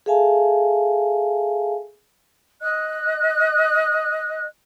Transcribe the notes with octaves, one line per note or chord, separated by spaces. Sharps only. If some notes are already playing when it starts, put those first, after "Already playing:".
G#4 A4 E5 F5 G#5 A5
D#5 F#6